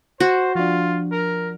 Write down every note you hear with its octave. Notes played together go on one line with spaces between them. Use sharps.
F#4 C5
F3 D4 F4
A#4